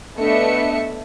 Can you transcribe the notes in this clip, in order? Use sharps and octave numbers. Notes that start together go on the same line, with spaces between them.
A3 B3 D4 D#5 E5 C#7